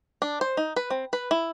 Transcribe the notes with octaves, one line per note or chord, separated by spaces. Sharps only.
D4
C5
D#4
B4
C4
B4
E4